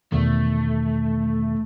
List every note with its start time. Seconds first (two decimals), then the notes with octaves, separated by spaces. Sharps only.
0.12 E2 B2 D#3 A3